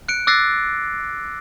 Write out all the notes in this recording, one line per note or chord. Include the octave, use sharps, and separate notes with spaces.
F#6 C#7 D7
D6 E6 F#6 A6 A#6 C7